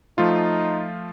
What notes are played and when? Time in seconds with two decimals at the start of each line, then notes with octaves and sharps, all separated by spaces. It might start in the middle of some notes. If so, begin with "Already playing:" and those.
0.18 F3 A3 D#4 F4